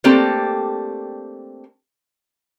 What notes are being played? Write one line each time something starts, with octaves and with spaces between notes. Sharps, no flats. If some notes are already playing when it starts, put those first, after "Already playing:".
A3 A#3 C4 D4 G4 A4